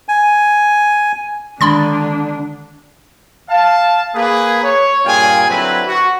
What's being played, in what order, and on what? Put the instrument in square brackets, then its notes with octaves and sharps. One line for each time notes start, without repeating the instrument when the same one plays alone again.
[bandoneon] G#5
[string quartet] D3 [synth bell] D#3 G#3 [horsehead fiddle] D4 [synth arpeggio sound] B5 C6 A6
[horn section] F5 A5
A#3 G#4 B4
C#5
G2 A#2 F4 G#4 G5 G#5
D3 F#3 C4 E4 B4
F#4